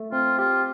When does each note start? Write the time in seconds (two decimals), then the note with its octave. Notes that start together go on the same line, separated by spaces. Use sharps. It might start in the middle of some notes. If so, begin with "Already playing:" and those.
Already playing: A3
0.12 C4 F4
0.38 F4 G4